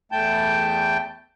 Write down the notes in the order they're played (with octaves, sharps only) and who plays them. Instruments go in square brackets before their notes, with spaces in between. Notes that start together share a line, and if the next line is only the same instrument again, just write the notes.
[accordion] E2 A3 G5 A5 G6